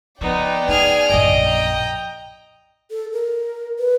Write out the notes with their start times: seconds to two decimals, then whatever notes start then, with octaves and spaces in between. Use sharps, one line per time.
0.21 F3 B3 D#4 D5 G5
0.69 D#4 G#4 G#5 F6
1.10 A#1 F#2 D#5 D7
1.45 G5 A#5
2.90 A4
3.12 A#4
3.79 B4